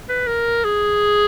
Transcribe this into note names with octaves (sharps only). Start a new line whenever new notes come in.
B4
A#4
G#4